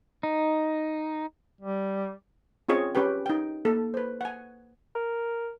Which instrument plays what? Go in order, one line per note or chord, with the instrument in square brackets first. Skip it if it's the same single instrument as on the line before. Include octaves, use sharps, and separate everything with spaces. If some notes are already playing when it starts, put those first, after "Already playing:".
[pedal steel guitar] D#4
[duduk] G3
[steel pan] C4 C#4 F4 G#4 C#5 D#5
C#4 G4 B4 G5
D#4 G5
A#3 A4
B4 C5
F#5 G#5
[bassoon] A#4